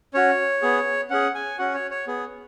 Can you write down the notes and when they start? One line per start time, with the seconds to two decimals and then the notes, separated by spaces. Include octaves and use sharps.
0.14 C#4 F#4 C#5
0.62 B3 G#4
1.10 C#4 G#4 F#5
1.35 G#5
1.59 C#4 F#4 F#5
1.75 C#5
1.91 C#5
2.07 B3 G#4